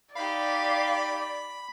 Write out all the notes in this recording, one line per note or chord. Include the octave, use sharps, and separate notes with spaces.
D#4 G4 D5 F5 B5